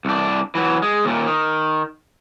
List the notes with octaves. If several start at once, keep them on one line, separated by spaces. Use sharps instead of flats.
C2 D4
E3 F#3
G#3
D#2 A#2
D#3